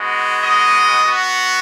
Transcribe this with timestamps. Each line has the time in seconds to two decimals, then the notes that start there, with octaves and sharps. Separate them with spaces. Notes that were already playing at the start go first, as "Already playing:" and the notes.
Already playing: G#3 B3 F#4
0.44 D#5
1.03 B3 F#4